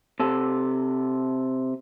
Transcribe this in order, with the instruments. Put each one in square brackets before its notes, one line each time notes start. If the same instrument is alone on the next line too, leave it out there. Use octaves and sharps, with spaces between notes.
[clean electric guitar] C3 A4